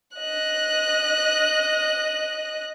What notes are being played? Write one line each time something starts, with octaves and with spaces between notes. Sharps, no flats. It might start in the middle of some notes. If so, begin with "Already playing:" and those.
D#5 F#6